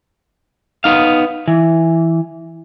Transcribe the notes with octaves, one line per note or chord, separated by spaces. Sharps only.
B3 D#4 F5
E3